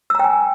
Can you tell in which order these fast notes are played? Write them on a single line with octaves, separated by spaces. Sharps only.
E6 A#5 G5 G#5